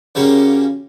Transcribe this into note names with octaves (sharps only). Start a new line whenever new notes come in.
F#2 C#3 G3 A#3 C#4